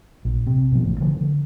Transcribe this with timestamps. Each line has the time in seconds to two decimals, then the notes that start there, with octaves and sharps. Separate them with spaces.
0.25 A#1
0.47 C3
0.72 B2 F3
0.84 A1 A2
1.01 D3 F3 A3
1.17 D3